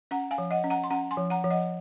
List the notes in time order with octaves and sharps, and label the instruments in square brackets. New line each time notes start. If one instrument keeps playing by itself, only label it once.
[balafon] C#4 F#5 A#5
F5 G#5
F3
D#5 F#5
C#4
F#5 A#5
C6
C#4 F#5 A#5
G#5 C6
F3
F#5 A#5
F3
D#5 F#5